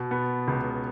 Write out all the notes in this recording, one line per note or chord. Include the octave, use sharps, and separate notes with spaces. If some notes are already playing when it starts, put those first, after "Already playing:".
Already playing: B2
B3
C#2